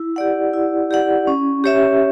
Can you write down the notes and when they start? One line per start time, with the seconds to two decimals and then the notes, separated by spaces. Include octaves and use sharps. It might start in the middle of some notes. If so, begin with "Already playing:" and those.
Already playing: E4
0.16 G4 D5 F#5
0.53 E4
0.91 G4 D5 F#5
1.27 C#4
1.64 G4 C#5 E5